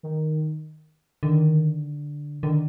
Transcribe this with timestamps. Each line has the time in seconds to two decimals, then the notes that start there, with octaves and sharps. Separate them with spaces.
0.03 D#3
1.23 D3 D#3
2.43 D3 D#3